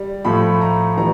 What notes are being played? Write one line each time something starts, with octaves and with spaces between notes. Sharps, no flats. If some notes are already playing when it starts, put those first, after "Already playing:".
Already playing: G3
A2 F3 A3 B5
A#5
E3 G3 A#5